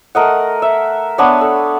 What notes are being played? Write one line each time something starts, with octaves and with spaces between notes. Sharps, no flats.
A3 A#4 D#5 F#5
E5
B3 D4 C#5
A4